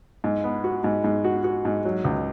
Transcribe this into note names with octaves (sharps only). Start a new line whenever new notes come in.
G#2
B3
F#4
G#2
G#2
F#4
F#4
G#2
F#3
C#2